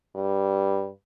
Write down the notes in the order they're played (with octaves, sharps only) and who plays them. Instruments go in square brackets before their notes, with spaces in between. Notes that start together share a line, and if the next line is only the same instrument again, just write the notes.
[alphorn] G2